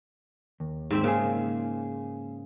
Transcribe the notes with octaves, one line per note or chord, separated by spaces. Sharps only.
D#2
G#2 C4 E5
C#3 A#3 G#4